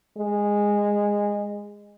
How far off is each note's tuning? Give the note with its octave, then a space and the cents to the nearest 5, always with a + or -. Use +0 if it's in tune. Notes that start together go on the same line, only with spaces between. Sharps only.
G#3 -15